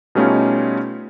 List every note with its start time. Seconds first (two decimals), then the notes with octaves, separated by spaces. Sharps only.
0.15 B2 G3 A3 C#4 D#4 F4